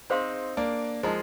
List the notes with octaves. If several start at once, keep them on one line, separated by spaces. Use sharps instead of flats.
C4 D#4 G#4 C5 F5 C6
A#3 D4
F3 G#3 D#4 A#4 D#5 A#5